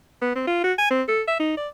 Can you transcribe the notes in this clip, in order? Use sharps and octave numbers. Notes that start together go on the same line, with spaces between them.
B3
C4
F4
F#4
G#5
C4
A4
E5
D#4
D5